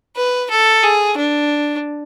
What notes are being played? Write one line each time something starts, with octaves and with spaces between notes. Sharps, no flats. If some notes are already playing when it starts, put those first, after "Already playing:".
B4
A4
G#4
D4